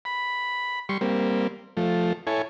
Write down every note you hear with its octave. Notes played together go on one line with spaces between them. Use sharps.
B5
G3 C6 C#6
G3 A#3 C4
F3 A3
E4 A4 C#5 G#5